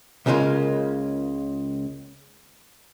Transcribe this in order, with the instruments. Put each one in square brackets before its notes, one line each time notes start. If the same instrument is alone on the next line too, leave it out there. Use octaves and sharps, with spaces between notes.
[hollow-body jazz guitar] C#2 C#3 G#3 A#3 F4